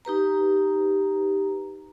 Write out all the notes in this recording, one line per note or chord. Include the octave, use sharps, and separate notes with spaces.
D#4 G4 B4 A#5